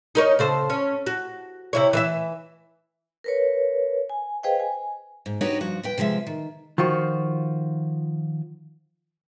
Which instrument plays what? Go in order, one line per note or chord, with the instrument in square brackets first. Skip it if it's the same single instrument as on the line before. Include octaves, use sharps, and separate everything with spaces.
[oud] D#4 A#4 C#5
C#3 A4 C5
C#4
F#4
C3 E4 C#5
E3 C5 E5
[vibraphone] A#4 B4 C#5
G#5
G#4 B4 C5 D#5 F5 G5
G#5
[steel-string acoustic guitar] G#2
D4 D#4 F#4 G4 B4 C#5
G2 F3 F#4
D#2 B4 G5
C3 F3 G#3 E5
D#3
[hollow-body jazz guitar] D#3 F3 F4 F#4